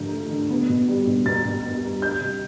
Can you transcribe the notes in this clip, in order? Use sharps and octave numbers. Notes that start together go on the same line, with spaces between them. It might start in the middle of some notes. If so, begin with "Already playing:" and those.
Already playing: D3 F3 A3 G6
A3
D3
B3
B2
G3
B2
B2 A6
B2
B3
G3
G3 G6
C3